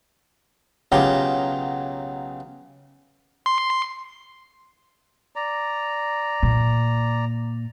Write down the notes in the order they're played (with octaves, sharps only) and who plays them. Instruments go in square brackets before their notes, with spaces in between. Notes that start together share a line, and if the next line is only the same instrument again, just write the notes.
[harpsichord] B1 C#3 F#3 F4 G4 A#5
[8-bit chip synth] C6
[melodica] D5 A#5
[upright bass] A#2